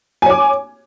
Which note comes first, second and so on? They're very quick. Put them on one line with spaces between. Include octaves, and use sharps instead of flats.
G#5 C#5 D6